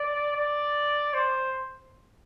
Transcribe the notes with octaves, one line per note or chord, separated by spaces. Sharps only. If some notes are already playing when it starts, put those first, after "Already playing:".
Already playing: D5
D5
C5